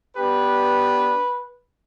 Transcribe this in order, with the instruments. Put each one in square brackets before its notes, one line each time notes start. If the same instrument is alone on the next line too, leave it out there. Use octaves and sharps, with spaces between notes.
[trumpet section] B3 D4 G4 B4